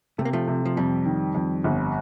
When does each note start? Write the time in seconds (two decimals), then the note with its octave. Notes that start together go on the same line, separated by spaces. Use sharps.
0.18 C3 A3
0.25 A#3
0.33 F3 A3
0.48 C3
0.65 F3
0.77 F2 G3
1.06 D#3
1.35 F2
1.64 G1